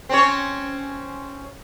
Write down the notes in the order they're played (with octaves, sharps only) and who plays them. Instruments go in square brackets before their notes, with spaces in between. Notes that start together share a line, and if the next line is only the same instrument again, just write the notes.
[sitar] C4 C#4 C#5